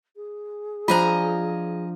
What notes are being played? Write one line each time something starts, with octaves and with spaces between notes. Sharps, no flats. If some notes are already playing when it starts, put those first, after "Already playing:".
G#4
F3 D4 F4 C5 D#5 G#5 A#5